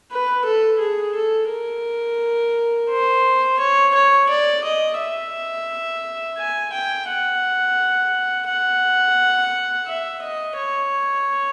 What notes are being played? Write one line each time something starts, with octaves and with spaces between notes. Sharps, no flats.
B4
A4
G#4
A4
A#4
C5
C#5
C#5
D5
D#5
E5
G#5
G5
F#5
F#5
E5
D#5
C#5